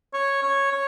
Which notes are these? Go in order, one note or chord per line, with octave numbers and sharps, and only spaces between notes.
C#5
C#5
C#5